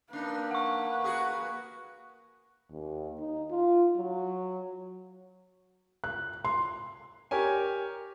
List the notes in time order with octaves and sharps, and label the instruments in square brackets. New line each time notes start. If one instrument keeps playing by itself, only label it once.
[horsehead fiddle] A#3 B4 [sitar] D4 D#4
[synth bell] F#5 C#6
[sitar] F#4 G#4
[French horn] D#2
D#4
F4
F#3
[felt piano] F#6
C6
[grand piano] G4 A#4 C#5 G#5